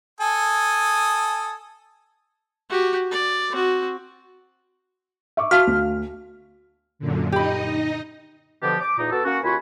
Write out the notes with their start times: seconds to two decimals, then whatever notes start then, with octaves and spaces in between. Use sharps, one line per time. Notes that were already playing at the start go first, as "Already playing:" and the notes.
0.21 A4 G#5 D#6
2.70 F#4 G4
3.11 D5
3.51 C4 F#4
5.37 E5 C#6 D6
5.51 F#4 F5 A5 F6
5.67 D2
6.99 F#2 A#2 D3
7.32 D#4 G4 D#5 B5
8.62 B2 D3 F3 D4 G4
8.80 D6
8.98 E2 A#2 D#4
9.11 B3 F#4 A4
9.25 A#3 C#4 F#4
9.43 D#2 F4 F#4 G#5 B5